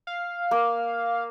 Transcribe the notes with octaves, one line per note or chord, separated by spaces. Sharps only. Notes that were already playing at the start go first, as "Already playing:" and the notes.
F5
A#3